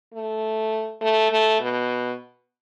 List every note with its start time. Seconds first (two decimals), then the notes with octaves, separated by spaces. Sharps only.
0.14 A3
1.01 A3
1.30 A3
1.60 B2